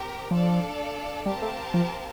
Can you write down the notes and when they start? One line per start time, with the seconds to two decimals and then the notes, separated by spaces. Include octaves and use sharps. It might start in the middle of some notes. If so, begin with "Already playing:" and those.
Already playing: C4 G4 A#4
0.31 F3 D4 A4 D5 F5
1.26 G3 C4 G4 A#4 F5 A5
1.42 A3
1.74 F3